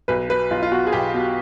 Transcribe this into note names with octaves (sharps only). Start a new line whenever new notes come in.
B1 B4
B2 B4
B1 F4
F4
B2 F#4
G#4
B1 G4
B2